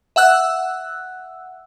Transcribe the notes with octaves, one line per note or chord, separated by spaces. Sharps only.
E5 F#5 E6 F#6